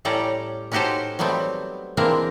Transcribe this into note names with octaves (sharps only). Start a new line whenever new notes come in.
A2 G3 C#4 A4 D5 A#5
C#4 D#4 F#4 G4 A4 C5
F#3 G3 A3 B3 C4
E3 G#3 A#3 C4 D4 A#4